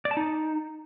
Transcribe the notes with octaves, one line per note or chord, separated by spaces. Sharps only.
D5
A5
D#4